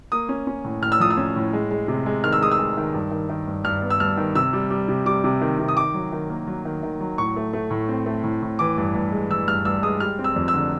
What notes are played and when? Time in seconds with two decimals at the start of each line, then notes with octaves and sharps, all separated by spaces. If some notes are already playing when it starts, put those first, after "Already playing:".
0.12 A#3 D#6
0.29 C#4
0.47 C#4
0.64 A2
0.82 A2 F6
0.92 E6
1.00 F3 D#6
1.11 E6
1.17 C#4
1.36 A2
1.53 G#3
1.71 G#3
1.88 C3
2.06 G#3
2.24 D#3 F6
2.33 E6
2.41 G#3 D#6
2.52 E6
2.59 G#3
2.77 D#3
2.94 G2
3.11 D#3
3.29 D#3
3.47 G2
3.64 G2 F6
3.82 B3
3.90 E6
4.00 G2 F6
4.17 D#3
4.35 C3 E6
4.53 G3
4.71 G3
4.88 C3
5.06 G3 D6
5.24 C3
5.41 D#3
5.59 C3
5.68 D#6
5.77 D#3 D6
5.94 F#3
6.12 D#3
6.30 A#3
6.47 F#3
6.65 D#3
6.83 D#3
7.01 F#3
7.18 A2 C#6
7.36 A3
7.53 A3
7.71 A2
7.89 C4
8.06 A3
8.24 A2
8.42 A2
8.59 E3 D6
8.78 G2
8.95 G2
9.12 G#3
9.30 E3 E6
9.48 G2 F6
9.65 G2 E6
9.83 G#3 D#6
10.00 G3 F6
10.19 C4
10.24 E6
10.36 F2
10.48 E6
10.54 D3